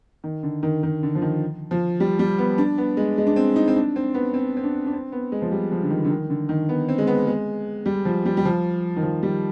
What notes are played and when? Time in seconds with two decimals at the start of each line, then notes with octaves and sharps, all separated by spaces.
0.24 D#3
0.43 D3
0.63 D#3
0.83 D#3
1.03 D3
1.15 F3
1.22 D#3
1.71 F3
2.00 G3
2.19 G3
2.39 B3
2.58 D4
2.78 B3
2.97 G#3
3.18 G#3
3.27 D4
3.36 C4
3.56 D#4
3.68 C4
3.76 D4
3.96 C4
4.14 B3
4.34 C4
4.57 C4
4.64 D4
4.86 D4
4.93 C4
5.12 B3
5.32 G#3
5.42 F3
5.52 G3
5.72 F3
5.83 D3
5.90 D#3
6.05 D3
6.10 D#3
6.30 D3
6.49 D#3
6.69 B3
6.89 C4
6.98 G#3
7.07 B3
7.27 G#3
7.86 G3
8.05 F3
8.26 G3
8.37 G3
8.45 F3
8.96 D#3
9.03 F3
9.23 G3